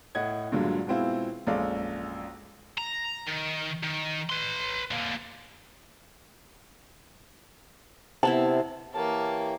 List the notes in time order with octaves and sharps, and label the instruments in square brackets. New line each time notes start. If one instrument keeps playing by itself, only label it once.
[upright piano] A2 D#5 F#5 G#6
G2 A#2 D3 F#3 G#3
B2 G#3 C4 E4 F4
A#1 F#2 G#3 A4 D5 F5
[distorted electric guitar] A#5
D#3
D#3
B4 C6
D3 A#3
[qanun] C3 B3 E4 [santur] A5
[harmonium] E3 G4 C#5 [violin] A#3 [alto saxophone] A5